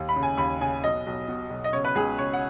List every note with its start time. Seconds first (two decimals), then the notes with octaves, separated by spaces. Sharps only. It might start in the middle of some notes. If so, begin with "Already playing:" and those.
Already playing: D#2
0.09 B5
0.16 C#3
0.23 G#5
0.38 D#2 B5
0.61 C#3 G#5
0.84 B1 D#5
1.06 B1
1.28 B2
1.51 B1
1.64 D#5
1.73 C#3 C#5
1.85 B4
1.95 C#2 G#4
2.18 C#3 C#5
2.33 F#5